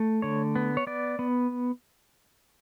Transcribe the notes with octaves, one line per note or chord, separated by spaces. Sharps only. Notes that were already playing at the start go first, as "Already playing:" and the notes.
Already playing: A3
D3 C#5
B3
C#5
B3 D5
B3